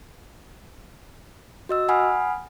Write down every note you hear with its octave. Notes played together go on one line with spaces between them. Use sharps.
F#4 D#5 E6
F#5 G#5 B5 D#6 F6